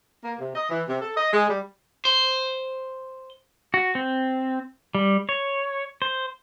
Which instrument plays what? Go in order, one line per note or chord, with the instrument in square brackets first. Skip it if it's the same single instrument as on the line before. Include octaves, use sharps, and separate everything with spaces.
[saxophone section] A#3
C3
D#5
E3
C3
A4
D#5
G#3
G3
[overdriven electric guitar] C5
[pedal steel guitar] F#4
C4
G3
C#5
C5